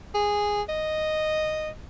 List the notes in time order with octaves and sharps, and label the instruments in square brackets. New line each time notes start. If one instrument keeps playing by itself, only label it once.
[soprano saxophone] G#4
D#5